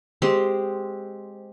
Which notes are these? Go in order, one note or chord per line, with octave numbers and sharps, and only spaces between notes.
G#3 C4 G4 C5